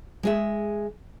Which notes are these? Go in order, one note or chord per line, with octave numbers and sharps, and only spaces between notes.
G#3 G#4 E5